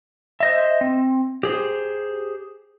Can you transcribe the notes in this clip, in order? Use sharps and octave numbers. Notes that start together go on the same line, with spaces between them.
C5 D#5 E5
C4
G4 G#4 C5